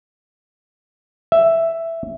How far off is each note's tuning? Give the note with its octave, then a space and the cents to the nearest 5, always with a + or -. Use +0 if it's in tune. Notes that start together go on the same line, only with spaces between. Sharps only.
E5 +5